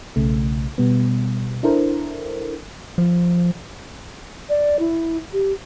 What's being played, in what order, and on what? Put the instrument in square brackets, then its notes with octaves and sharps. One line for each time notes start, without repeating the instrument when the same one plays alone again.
[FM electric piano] B1 C#3 A3
B2 G3 B3
D4 E4 A4 A#4 C5
[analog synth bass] F3
[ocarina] D5
E4
G4